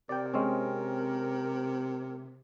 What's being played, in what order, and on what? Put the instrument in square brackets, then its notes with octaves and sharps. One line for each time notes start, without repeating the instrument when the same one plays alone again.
[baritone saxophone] C3 [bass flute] A#4 [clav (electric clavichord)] D5 G5
[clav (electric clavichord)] G#3 C4 C#4